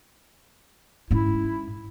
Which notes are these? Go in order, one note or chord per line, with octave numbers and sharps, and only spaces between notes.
G#2 C#4 E4